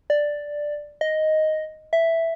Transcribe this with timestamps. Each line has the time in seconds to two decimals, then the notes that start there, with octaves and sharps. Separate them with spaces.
0.10 D5
1.01 D#5
1.93 E5